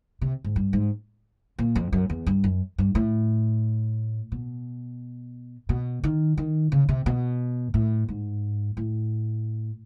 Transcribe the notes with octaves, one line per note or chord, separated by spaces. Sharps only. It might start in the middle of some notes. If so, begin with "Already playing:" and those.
C3
G#2
G2
G#2
A#2
F2
F#2
E2
G2
F#2
G2
A2
B2
B2
D#3
D#3
C#3
C3
B2
A2
G#2
A2